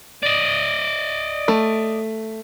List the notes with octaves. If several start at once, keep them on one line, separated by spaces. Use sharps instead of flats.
D5 D#5
A3